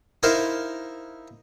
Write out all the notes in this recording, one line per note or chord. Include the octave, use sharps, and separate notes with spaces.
D#4 E4 A#4 C5 E5 F5